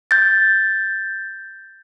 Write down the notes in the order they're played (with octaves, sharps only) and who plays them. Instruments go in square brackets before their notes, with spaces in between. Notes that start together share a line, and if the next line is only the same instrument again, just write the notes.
[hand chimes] G6 A6